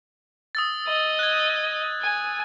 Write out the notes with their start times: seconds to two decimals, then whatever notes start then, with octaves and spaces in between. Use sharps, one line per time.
0.55 D#6 E6 A6
0.87 D#5
1.19 F#6 G#6
2.01 G#5